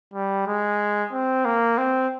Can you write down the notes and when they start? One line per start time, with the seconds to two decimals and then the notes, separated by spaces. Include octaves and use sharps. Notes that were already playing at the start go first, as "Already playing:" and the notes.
0.14 G3
0.47 G#3
1.12 C4
1.45 A#3
1.78 C4